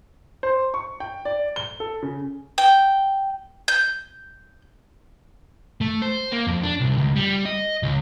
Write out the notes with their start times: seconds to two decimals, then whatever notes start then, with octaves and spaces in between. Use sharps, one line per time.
0.43 C5
0.74 C#6
1.00 G5
1.25 D5
1.56 G7
1.80 A4
2.03 C#3
2.58 G5
3.68 G6
5.81 A3
6.02 C5
6.32 A#3
6.47 F2
6.63 D4
6.81 C2
6.98 C#2
7.16 G3
7.45 D#5
7.83 C#2